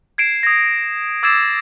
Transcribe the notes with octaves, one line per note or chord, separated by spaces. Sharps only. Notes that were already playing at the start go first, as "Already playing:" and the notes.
G#6 C7 D7 E7
D#6 G#6 A#6
D6 E6 G#6 A6 C7 E7